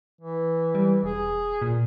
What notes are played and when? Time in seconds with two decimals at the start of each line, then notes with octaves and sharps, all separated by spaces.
0.21 E3
0.75 G3
1.04 E1 G#4
1.62 A#2